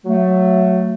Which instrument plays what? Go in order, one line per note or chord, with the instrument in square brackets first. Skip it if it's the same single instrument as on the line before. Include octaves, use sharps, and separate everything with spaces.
[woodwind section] F#3 A3